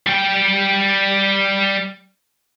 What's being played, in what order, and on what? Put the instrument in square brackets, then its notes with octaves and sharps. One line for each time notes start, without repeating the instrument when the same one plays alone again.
[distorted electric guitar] G3 G5